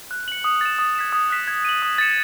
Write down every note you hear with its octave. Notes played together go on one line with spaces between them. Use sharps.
F#6
C#7 F#7
D#6
A6 E7
D#6
G#6 B6 E7
D#6
F#6 B6 E7
G#6
D#7 F#7
D#6
A6 C#7 E7